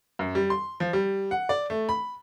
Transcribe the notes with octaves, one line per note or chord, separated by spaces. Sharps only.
F#2
G3
C6
F3
G3
F#5
D5
A3
B5